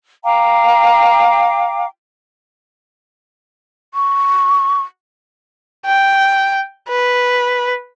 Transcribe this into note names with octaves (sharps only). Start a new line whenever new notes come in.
F5 G5 A#5 D6
C#6
G5
B4